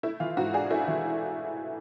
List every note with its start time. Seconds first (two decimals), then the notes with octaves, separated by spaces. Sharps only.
0.03 A3 E4
0.20 E3 F4
0.37 G#2 F#4
0.54 D4 G#4
0.71 A3 E4
0.88 E3